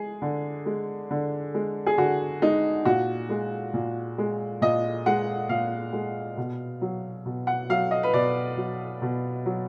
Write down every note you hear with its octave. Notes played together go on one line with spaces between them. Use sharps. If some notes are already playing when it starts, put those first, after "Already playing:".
Already playing: G#3 G#4
D3
G#3
D3
G#3
G#4
D3 F#4
G#3 D#4
A#2 F#4
G#3
A#2
G#3
A#2 D#5
G#3 F#5
A#2 F5
G#3
B2
F#3
B2
F#5
F#3 F5
D#5
B4
B2 D5
F#3
B2
F#3